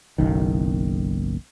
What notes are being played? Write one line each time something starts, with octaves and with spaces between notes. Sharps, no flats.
F#1 B1 D#3